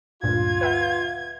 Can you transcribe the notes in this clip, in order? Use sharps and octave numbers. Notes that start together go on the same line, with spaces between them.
D2 G2 A#2 F4 G#6
B4 E5 F#5